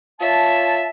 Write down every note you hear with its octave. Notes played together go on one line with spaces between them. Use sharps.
F4 C#5 E5 A5